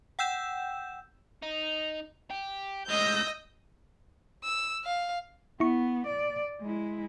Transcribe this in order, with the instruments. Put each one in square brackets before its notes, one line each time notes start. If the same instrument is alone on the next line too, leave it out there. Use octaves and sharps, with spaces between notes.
[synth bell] F#5 G5 E6 G6 E7
[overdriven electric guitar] D#4
G4
[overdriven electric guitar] A2 G#3 [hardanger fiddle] D#5 [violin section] E6 G6 A#6
[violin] E6
F5
[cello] B3 [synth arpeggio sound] E4 C#6
[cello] D5
G#3 E4